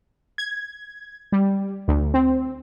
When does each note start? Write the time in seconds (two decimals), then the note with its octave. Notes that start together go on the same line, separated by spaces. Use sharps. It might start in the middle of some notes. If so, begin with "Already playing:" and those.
0.38 G#6
1.32 G3
1.88 D2
2.14 C4